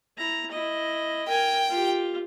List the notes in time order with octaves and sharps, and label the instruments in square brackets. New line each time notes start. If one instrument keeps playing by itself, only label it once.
[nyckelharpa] E4 A#5
E4 D#5
[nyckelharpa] A#4 G#5 [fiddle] G5
[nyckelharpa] F4 G4